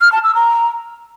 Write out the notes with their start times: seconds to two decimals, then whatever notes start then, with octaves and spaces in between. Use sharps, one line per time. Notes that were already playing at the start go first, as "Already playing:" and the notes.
0.01 F6
0.12 A5
0.24 E6
0.35 A#5